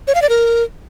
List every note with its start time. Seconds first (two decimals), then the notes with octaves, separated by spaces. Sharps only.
0.08 C#5
0.15 F5
0.22 D5
0.29 A#4